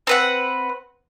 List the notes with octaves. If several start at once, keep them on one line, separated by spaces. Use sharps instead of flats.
C4 B4 F#5